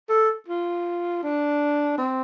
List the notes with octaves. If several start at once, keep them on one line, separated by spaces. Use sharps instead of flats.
A4
F4
D4
C4